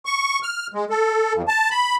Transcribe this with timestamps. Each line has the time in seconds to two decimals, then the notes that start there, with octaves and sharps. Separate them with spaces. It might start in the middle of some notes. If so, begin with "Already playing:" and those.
0.06 C#6
0.43 F6
0.74 G#3
0.90 A4
1.34 F2
1.48 A5
1.71 B5